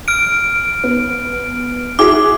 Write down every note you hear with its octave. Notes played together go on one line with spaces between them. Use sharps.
F6 D7
B3
E4 F#4 G#4 D6